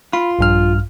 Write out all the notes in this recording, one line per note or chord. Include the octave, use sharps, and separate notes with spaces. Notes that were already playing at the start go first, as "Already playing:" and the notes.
F4 B5
A#1 G2 F6